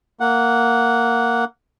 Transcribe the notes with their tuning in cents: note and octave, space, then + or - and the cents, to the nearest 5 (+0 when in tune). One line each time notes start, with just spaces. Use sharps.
A#3 -10 F#5 -5